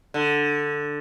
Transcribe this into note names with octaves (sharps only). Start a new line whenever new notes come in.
D3